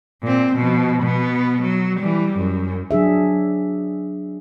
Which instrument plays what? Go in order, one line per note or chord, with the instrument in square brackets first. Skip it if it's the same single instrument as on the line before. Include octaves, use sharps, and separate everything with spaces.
[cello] A#2 C4
B2 F3
B2 B3
F#3
E3 G3
F#2
[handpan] F#3 D4 G#4 E5